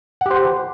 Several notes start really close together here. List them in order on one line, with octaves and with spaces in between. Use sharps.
F#5 G4 C5